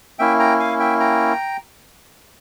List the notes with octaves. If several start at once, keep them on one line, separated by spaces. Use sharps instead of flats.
A#3 C#4 E4 E5 G5
G5 A#5
F5 G#5
E5 G5
G5 A#5